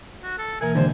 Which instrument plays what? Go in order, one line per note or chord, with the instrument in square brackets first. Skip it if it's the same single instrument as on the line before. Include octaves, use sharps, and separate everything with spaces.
[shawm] F#4
A4
[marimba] B2 E3 A#3 [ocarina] A#4 [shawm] G#5
[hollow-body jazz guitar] D#2 G#2 D3 [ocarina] C5